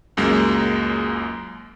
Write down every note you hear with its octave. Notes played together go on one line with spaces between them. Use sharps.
C#2 F#2 G#3 A#3